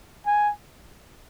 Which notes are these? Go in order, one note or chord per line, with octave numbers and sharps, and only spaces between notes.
G#5